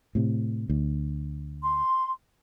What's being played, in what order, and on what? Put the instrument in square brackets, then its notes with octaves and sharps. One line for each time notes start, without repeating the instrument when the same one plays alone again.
[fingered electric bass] A2 C3
D2
[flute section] C6